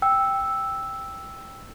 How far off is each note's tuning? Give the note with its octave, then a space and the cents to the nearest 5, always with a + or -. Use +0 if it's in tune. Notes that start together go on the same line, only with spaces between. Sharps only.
G5 +0 E6 +0